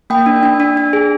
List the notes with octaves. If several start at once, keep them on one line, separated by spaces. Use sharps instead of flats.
A#3 G5
D4
D4
D4
D4
G#4